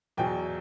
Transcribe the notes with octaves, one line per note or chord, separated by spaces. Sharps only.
E2 B2 F#3 G5